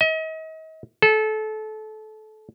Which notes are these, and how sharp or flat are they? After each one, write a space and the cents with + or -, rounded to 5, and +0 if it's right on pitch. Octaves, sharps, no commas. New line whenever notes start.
D#5 +40
A4 -25